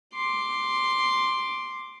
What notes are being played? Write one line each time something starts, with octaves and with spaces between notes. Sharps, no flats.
C6 D6